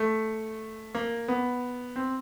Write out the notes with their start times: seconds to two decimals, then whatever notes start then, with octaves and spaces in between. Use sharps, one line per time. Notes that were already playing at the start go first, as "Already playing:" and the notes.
Already playing: A3
0.95 A#3
1.28 B3
1.96 C4